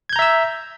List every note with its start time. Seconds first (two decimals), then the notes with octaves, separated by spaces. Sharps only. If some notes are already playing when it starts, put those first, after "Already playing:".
0.09 G#6
0.13 G6
0.16 A#5
0.19 E5
0.22 E6